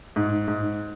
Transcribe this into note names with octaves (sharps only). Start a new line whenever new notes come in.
G#2
G#2